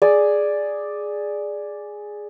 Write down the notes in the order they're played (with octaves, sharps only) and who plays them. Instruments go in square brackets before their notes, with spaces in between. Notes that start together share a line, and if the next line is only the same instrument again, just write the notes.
[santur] G#4 D5